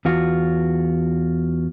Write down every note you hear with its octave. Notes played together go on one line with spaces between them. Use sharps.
E2 F4 F#4